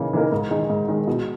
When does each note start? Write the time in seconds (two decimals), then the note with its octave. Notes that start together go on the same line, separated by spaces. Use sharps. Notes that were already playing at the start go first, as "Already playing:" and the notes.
Already playing: C#3 E3 A#3 D#4
0.13 E3 A#3 D#4 A#4
0.32 G#2
0.51 D#3 G#3
0.70 G#2
0.88 D#3 G#3
1.07 B2